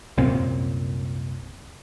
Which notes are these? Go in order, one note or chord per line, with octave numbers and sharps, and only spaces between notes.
C2 F#2 A#2 C4